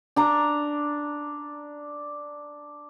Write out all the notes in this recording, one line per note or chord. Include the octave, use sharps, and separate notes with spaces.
D4 A#5